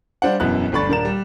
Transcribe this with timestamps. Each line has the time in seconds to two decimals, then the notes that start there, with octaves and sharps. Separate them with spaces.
0.22 G3 D4 C5 F5 F#5
0.40 E1 F#2 B2 B3 E4 F#6
0.72 G1 D2 D4 B5 C#6 A6
0.88 D#1 D4 A#4 A#5 E7
1.05 G3